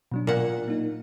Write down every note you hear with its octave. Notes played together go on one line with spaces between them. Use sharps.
B2 F#3 D4
A#2 F#5
A#3 D#4